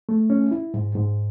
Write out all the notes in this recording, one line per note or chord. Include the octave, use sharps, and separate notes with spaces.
A3
C#4
E4
G#2
G#2